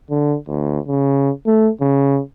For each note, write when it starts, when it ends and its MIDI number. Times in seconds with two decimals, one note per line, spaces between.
0.10 0.36 50
0.47 0.79 38
0.88 1.30 49
1.47 1.69 57
1.81 2.19 49